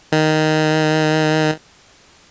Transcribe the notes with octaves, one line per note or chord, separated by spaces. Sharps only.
D#3